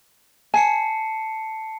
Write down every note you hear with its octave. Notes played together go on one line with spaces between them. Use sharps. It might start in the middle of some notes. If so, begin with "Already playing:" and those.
G#5 A5 C7 C#7